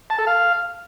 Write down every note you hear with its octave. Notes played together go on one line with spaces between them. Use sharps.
A5
A4
F5